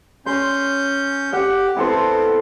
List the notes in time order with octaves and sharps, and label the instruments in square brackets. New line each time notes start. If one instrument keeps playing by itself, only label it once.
[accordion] C#4 G6 [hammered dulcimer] C6
[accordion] G4 [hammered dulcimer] F#5
[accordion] B3 C4 [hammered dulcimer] E4 A4 C5